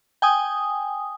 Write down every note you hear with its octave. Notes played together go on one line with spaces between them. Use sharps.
G5 G#5 D#6